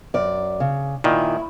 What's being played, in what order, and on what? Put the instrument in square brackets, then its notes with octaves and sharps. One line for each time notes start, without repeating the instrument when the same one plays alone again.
[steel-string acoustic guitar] F#2 D5
C#3
[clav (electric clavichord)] A#2 D#3 [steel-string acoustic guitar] E4